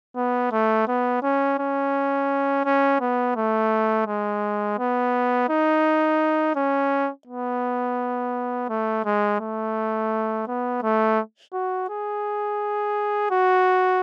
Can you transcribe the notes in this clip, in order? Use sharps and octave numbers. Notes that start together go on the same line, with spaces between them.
B3
A3
B3
C#4
C#4
C#4
B3
A3
G#3
B3
D#4
C#4
B3
A3
G#3
A3
B3
A3
F#4
G#4
F#4